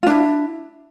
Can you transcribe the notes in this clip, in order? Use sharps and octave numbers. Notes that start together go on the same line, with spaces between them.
D4 E4 F4